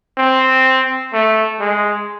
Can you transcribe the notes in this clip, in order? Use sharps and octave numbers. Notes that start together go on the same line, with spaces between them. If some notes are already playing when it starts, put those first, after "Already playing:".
C4
A3
G#3